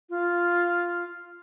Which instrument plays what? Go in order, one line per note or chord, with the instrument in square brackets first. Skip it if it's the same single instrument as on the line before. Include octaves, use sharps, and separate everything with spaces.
[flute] F4